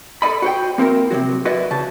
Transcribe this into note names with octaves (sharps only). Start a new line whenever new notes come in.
A4 B4 D5 D#5 B5
F#4 C5 G5
A#3 C4 E4 A#4
C3 F3 F#3 F#4
E4 F#4 B4 D5 D#5
C#3 A5